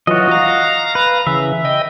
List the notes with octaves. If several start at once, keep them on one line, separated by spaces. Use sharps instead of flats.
E3 F#3 F4 F#4 D#5
F5 A#5
B4
C#3 E3 E5
D#5 G5